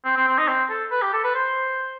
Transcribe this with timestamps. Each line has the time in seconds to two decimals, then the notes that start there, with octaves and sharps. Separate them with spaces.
0.05 C4
0.17 C4
0.28 C4
0.38 D#4
0.48 C4
0.70 A4
0.91 B4
1.02 G4
1.13 A4
1.24 B4
1.35 C5